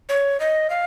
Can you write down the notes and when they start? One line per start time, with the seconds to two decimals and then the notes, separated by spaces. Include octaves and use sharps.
0.09 C#5
0.40 D#5
0.70 F5